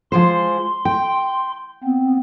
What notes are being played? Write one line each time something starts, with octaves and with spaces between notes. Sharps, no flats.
F3 G#3 C5 C6
G5
B3 C4